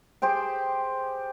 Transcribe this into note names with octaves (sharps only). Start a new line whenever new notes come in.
G4 G#4 C5 G5